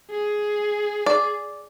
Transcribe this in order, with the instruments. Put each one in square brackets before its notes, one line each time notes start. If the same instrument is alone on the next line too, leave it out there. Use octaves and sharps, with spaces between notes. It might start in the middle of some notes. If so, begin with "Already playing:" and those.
[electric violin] G#4
[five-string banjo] D5